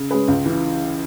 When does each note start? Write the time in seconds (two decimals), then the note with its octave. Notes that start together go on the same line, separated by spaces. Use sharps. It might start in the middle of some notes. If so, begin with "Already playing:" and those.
Already playing: C#3
0.11 G#3 C#4 G#4 B4
0.28 C#2
0.46 C#3 E3